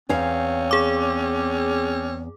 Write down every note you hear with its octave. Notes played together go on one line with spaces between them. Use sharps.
E2 C4 C#4 C#5 F5
G#4 D6